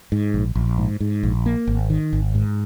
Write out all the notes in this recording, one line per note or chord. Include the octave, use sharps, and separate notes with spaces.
G#2
A#1
A#1
G#2
G#2
A#1
A#3
G#1
D#3
G#1
G#2